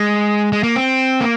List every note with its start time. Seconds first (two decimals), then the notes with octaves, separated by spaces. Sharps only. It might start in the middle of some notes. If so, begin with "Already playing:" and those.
Already playing: G#3
0.53 G#3
0.63 A#3
0.76 C4
1.21 A#3